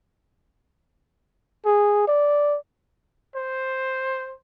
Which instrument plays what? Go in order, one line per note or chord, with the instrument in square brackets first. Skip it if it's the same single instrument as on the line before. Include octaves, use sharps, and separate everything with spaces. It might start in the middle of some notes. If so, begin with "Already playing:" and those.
[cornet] G#4
D5
C5